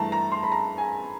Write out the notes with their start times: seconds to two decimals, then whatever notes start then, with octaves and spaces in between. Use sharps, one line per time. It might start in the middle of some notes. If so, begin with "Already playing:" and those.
Already playing: G2 E3 A3 A5 A#5
0.12 A#5
0.32 C6
0.43 B5
0.52 A#5
0.78 G#5